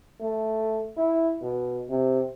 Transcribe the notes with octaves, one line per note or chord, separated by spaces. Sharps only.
A3
E4
B2
C3